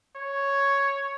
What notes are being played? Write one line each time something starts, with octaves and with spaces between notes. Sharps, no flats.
C#5